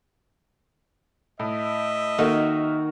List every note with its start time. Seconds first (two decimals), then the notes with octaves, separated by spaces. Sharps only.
1.40 A2 D#5 E5
2.18 D#3 A#3 D#4 F#4 A4 A#4